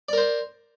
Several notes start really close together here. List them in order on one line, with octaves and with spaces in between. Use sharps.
D5 A#4 C5